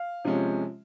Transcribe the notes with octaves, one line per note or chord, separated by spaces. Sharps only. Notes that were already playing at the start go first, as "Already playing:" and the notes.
Already playing: F5
C3 F3 G#3 C#4